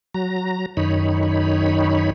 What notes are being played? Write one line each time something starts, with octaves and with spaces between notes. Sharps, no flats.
F#3 A#5
F#2 D#3 D#4 C#5 B5